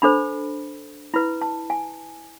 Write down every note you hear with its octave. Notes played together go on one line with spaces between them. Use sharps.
D4 A4 C5 B5
E4 B4 B5
A5
G#5